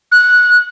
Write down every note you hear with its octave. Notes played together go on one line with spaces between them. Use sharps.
F#6